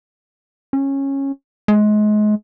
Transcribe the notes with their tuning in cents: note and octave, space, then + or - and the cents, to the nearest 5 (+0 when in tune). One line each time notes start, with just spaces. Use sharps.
C#4 -15
G#3 +30